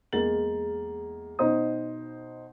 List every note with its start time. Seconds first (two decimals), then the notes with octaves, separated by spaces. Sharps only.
0.13 E2 G#3 A#3 G#4 A6 F#7
1.39 B2 D#4 C5 D#6